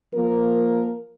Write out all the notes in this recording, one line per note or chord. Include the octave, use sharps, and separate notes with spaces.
F3 A#3 A#4